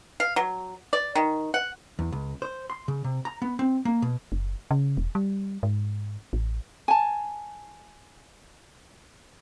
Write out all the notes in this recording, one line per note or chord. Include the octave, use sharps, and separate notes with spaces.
F5
F#3
D5
D#3
F#5
E2
C#2
C5
C6
C#3
C3
A#5
B3
C4
A#3
B2
F#1
C#3
E1
G3
G#2
A1
G#5 A5